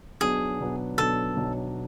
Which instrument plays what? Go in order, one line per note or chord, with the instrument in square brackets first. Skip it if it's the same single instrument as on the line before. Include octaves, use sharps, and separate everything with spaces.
[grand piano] B1 B2 F#3 B3 D4 [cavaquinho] G#4
[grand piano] B1 B2 F#3 B3 D4
[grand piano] B1 B2 F#3 B3 D4 [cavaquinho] A4
[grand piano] B1 B2 F#3 B3 D4